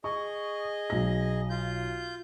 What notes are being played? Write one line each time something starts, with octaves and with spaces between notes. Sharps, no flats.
G#4 D#5 C#6
B1 A#6
F4 G6